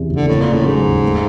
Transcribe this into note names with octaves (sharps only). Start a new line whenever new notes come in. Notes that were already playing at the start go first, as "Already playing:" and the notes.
Already playing: E2 C3 E3
F#1
D3
A2 A#3
A#2
C#3
A2
G#2 F#3
D#2
A3